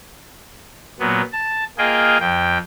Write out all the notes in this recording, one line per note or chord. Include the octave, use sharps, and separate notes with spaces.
A#2 F#3 B3
A5
A#3 F4 G#4 D#5 G5
F2 G5